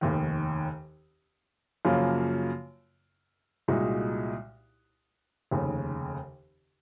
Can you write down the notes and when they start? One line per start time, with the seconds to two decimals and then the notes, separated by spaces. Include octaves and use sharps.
0.01 F1 D#2 D#3
1.85 F#2 C#3 F3 A#3 F4
3.68 C2 A#2 G#3 D#4 F#4
5.51 F1 D#2 C#3